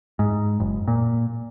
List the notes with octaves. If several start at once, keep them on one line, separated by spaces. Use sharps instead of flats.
G#2
F#1
A#2